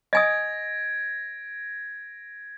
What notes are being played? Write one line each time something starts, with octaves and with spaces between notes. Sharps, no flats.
D#5 G#5 D#6 G#6 A#6 D7